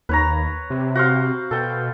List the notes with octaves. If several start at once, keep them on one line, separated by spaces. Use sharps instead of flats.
D#2 B4 C#5 A#5
C3
F#4 C5 F5
B2 A4 G5